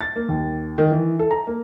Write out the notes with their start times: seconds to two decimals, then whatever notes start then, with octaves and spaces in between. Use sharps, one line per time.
0.01 A6
0.16 A#3
0.29 D#2
0.78 D#3
0.91 E3
1.19 A4
1.31 A#5
1.47 A#3